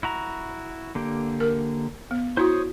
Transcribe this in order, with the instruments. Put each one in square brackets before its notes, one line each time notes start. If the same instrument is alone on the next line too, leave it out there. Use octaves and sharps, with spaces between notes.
[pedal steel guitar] E4 F#4 A#5
D3 A#3 G4
[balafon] A#4
B3
[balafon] E4 F#4 [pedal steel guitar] C5 C#5 D#6